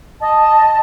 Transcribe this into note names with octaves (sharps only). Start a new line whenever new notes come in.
D#5 A5